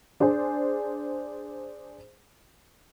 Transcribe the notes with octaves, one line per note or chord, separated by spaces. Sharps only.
D4 G#4 C5